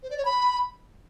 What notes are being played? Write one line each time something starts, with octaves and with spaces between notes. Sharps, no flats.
C5
D5
C#5
B5